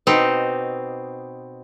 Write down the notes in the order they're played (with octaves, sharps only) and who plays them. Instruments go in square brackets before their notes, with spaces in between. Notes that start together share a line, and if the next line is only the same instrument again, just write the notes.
[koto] B2 C4 D#4